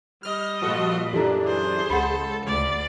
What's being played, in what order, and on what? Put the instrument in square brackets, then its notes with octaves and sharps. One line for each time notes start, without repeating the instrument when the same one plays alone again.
[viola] G3 D#5 [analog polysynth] F6
[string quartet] A#2 [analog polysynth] F3 F#4 A4
[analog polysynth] F#2 E3 D4 [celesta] G4 A4 A#5
[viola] G#4 C5
[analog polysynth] C#2 [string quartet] A4 [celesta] F#5 B5
[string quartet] D2 [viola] D5